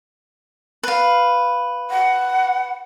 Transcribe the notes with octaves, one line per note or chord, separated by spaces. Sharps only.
B4 F5
F#5